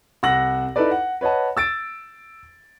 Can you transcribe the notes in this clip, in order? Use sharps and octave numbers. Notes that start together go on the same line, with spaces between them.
C2 F#5 E6 A#6 F#7
D#4 E4 A4 B4 D5
F#5
B4 C#5 D#5 F#5 A5
E6 A6 D7